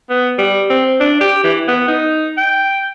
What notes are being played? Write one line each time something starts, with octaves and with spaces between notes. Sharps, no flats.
B3
G3
C4
D4
G4
E3
B3
D#4
G5